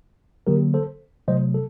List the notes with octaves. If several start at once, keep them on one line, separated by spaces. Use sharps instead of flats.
D3 F#3 A#3 G4 A#4
A4 C5
C3 F#3 A3 C5 D#5
A4